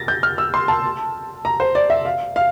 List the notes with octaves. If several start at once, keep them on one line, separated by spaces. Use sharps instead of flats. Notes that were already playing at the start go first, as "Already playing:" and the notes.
Already playing: A6 A#6
G6
F6
E6
C6
A5
A#5
C5
D5
E5
F5
F5